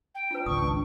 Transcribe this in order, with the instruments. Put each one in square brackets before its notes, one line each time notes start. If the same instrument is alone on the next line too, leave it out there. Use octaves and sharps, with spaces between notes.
[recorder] G5
[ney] D4 [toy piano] F4 B4
[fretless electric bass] G#1 C#2 [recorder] C#6 [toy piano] D#6